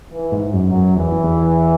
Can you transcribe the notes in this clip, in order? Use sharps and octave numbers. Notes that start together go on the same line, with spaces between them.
E3
G#2
F#2
F#3
F#2
E2 E3
E2